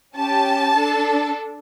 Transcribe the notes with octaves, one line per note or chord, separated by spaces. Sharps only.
C#4 G4 A5
D4 A4